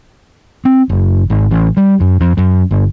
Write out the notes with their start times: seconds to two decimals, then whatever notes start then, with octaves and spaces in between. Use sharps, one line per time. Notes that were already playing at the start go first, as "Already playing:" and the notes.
0.65 C4
0.89 F#1
1.30 G#1
1.51 A1
1.77 G3
2.00 F#2
2.20 F2
2.37 F#2
2.71 G1